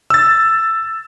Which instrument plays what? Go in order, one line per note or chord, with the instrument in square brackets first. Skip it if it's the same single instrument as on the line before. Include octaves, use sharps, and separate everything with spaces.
[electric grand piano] E6 A6